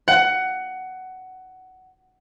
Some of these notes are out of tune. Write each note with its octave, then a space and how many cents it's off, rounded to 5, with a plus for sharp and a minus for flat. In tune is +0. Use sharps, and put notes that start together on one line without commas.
F#5 +15